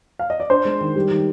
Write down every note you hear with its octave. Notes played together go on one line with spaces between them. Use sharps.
F5
D#5
D5
D4 C5
G#3
D#3
G3
D#3